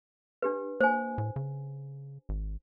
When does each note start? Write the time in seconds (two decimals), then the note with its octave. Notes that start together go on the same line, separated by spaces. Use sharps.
0.42 D4 G4 B4
0.80 A#3 C5 G#5
1.18 A2
1.36 C#3
2.29 G#1